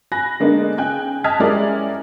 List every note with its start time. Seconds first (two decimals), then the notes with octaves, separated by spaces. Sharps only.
0.12 G#5 B5 F#6 A#6
0.40 D3 G#3 A#3 B3 D4 D#4
0.78 C#3 G5 G#5 F#6
1.24 D#5 A5 D#6 F6 G#6 B6
1.40 G3 G#3 C#4 E4 A#4 D5